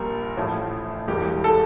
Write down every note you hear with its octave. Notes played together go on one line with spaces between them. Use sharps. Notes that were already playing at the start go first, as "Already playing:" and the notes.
Already playing: A#1 A#2 G3 A#4
A1 A2 F3 A3 E4
E1 E2 E3 G3 G4
A4